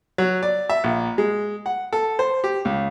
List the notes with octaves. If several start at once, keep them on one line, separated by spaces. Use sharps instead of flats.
F#3
D5
E5
A#1
G#3
F#5
A4
C5
G4
C#2